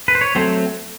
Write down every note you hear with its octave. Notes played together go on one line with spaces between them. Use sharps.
B4
C5
C#5
F#3 A3 C4 C5